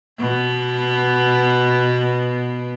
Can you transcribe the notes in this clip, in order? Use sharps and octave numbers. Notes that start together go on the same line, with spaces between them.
B2 B3